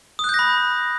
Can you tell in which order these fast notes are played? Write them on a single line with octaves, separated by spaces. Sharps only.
D#6 F#6 G6 A#6 B5